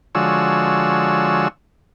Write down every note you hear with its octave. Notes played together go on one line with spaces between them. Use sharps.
D3 F3 G#3 F#4 C#5 E6